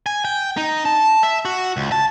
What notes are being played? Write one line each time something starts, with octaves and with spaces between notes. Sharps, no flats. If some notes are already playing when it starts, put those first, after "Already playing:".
G#5
G5
D#4
A5
E5
F#4
C#2
A5